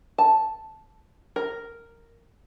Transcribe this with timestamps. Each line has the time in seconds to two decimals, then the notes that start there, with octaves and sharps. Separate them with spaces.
0.18 A5
1.36 A#4